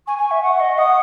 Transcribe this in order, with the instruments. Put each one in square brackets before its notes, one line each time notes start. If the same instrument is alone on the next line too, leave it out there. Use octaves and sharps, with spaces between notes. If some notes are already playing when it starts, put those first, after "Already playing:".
[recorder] G#5 [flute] C#6
[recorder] G#5
E5
F#5
D#5
[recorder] F#5 [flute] D#6